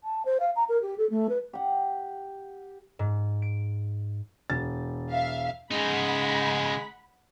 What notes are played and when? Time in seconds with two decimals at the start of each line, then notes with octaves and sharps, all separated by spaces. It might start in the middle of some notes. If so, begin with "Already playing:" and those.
0.04 A5
0.25 C5
0.40 F5
0.56 A#5
0.69 A#4
0.82 G4
0.98 A4
1.10 A3
1.29 B4
1.53 G4 F#5
2.99 G#2
3.42 D7
4.50 E1 A6
5.11 E5 F5
5.71 C#3 G#3 D#4 F#5 B5 B6